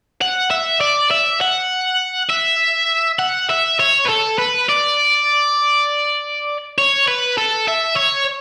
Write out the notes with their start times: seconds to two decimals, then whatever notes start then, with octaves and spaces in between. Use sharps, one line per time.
0.21 F#5
0.51 E5
0.81 D5
1.11 E5
1.41 F#5
2.30 E5
3.19 F#5
3.50 E5
3.80 C#5
4.05 B4
4.09 A4
4.38 B4
4.69 D5
6.78 C#5
7.08 B4
7.37 A4
7.68 E5
7.97 C#5